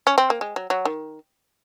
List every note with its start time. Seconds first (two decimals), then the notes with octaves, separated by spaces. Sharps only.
0.07 C#4
0.18 C4
0.30 A#3
0.41 G#3
0.56 F#3
0.70 F#3
0.85 D#3